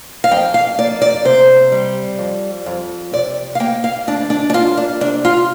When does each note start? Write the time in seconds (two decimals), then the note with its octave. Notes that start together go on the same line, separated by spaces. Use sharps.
0.24 F5
0.31 F2 G5
0.54 F5
0.78 A#3 D5
1.02 D5
1.25 C3 C5
1.72 G3
2.19 F2
2.66 F2
3.13 C3 D5
3.55 F5
3.60 A#3 G5
3.84 F5
4.07 D2 D4
4.30 D4
4.50 D4
4.54 A#3 F4
4.77 D4
5.01 C3 D4
5.25 F4